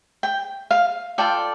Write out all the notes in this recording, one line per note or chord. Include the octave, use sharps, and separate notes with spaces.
G5
F5
F4 A4 D5 G5